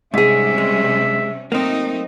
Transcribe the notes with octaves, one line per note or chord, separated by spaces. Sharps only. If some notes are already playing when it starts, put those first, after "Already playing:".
G#2 C3 G3 C#4 G#4 E5
G#3
F#3 A3 A#3 C4 D#4